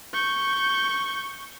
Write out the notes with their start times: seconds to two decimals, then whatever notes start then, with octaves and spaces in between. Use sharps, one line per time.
0.14 C#6 G6